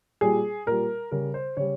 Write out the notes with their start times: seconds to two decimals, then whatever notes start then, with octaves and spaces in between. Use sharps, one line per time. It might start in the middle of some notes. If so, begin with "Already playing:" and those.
0.21 A#2 G3 G#4
0.66 A#2 G3 A#4
1.12 C#3 G3 A#4
1.34 C5
1.57 C#3 G3 C#5